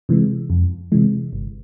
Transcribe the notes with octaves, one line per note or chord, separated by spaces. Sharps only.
C3 E3 G#3
F2
C3 E3 G#3
G1